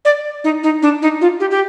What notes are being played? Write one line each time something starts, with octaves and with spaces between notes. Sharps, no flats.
D5
D#4
D#4
D4
D#4
F4
G4
G4